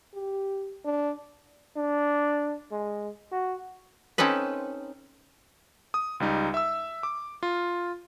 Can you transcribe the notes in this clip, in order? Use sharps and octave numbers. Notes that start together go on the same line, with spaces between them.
G4
D4
D4
G#3
F#4
C4 C#4 D#4 A4 B4
D#6
C#2 G3 D#4
E5 E6
D6
F4